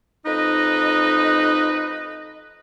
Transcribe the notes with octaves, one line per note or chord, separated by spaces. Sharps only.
F2 D#4 B4 D#5